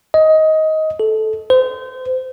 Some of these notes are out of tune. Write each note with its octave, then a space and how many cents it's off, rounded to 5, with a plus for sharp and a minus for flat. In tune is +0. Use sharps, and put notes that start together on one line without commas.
D#5 +15
A4 -15
C5 -30